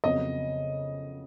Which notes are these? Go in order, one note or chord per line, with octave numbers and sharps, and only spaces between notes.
F2 C#3 F#3 B3 D#5